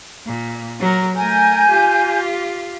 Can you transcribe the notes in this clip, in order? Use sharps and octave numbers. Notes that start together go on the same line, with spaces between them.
A#2
F#3 A#4
A3 A#4 G#5 G6
F4 G4